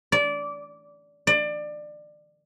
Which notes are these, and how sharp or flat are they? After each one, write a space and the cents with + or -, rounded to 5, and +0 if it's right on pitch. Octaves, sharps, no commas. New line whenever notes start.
D5 -20
D5 +25